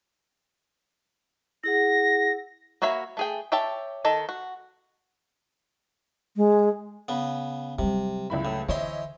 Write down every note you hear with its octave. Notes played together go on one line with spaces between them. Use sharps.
E4 G#4 F#5 A#6
A#3 F#4 C#5 E5 B5
A3 G#4 G5
G4 C#5 E5 G5 A5
D#3 D#4 A4
F#4
G#3
C#3 B3
C3 F#3 G3
C#2 E4 B5
A2
D3 E3 C5 C#5 D#5 E5 C6